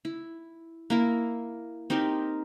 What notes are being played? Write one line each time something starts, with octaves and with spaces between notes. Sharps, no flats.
E4
A#3 E4 A#4
C4 D#4 G4 A#4